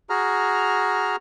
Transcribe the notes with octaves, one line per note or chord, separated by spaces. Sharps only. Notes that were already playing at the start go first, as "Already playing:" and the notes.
F#4 G#4 A#5 F6